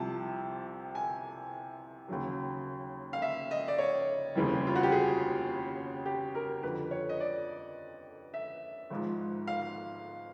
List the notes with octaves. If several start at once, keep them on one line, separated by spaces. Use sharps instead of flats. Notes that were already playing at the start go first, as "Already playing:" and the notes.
Already playing: C2 C3 F3 A5
G#5
D#2 C#3 F#3
F5
E5
D#5
D5
C#5
F1 D#2 C#3 E3 G3
F4
F#4
G4
G#4
G4
A#4
F2 D3 F3 B4
C#5
D#5
D5
E5
G#1 G#2 F3
F5